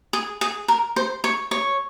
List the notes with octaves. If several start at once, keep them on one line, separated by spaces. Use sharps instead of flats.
G#4
G#4
A#4
C5
C#5
C#5